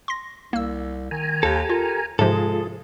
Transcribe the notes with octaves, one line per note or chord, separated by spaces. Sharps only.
C6 A#6
C2 A#3 E6
D#3 G#5 A#5
D#2 G4 A4
F4 A#4
G#2 C3 F3 G#3 F4 G#4 A4